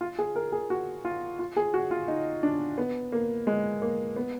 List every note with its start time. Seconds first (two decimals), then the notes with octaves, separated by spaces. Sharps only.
0.01 F4
0.19 G#4
0.36 A#4
0.52 G#4
0.70 F#4
1.05 F4
1.39 F4
1.57 G#4
1.74 F#4
1.91 F4
2.08 D#4
2.43 D4
2.78 B3
3.12 A#3
3.47 G#3
3.82 A#3
4.16 B3